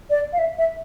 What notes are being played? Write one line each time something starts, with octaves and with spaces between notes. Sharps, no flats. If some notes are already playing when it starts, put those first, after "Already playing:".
D5
F5
E5
E5